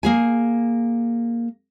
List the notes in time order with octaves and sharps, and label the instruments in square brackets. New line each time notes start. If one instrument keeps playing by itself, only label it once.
[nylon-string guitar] A#3 G#4 G#5